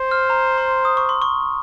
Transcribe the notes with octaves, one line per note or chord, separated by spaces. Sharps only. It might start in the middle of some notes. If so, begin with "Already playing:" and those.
Already playing: C5
F6
A#5
C6
D#6
C#6
C6
C#6